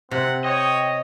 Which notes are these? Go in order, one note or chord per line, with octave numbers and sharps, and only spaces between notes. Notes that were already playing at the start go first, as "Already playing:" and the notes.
C3 C4 F#5
C#5 D#5 G5